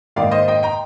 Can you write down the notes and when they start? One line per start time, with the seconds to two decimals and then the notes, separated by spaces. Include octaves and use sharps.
0.16 G#2 D#3 A#3 D5 F5
0.31 C5 D#5
0.48 D#5 G5
0.63 G5 A#5